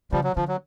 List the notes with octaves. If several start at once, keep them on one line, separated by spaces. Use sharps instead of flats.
C#3 F3 G3
F#3
D3 F3
F#3